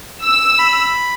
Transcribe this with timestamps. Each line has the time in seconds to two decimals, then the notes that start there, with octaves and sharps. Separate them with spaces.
0.24 E6
0.59 B5